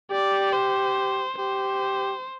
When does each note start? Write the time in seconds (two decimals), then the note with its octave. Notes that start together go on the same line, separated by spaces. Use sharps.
0.11 G4 D5
0.53 C5
1.39 G4 C5